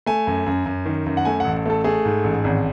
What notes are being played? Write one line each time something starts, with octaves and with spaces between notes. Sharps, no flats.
A3 G#5
F#2
F#2
F#2
D#3
F#2
F#5
A3 G#5
A1 F#5
A3 A4
A3 G#4
G#2
A1
G#1